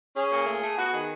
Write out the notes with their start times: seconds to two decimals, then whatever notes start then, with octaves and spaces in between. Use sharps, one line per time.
0.15 C#4 G#4
0.31 A#2
0.46 A3
0.62 A3
0.77 B3 F#4
0.93 D#3 G#4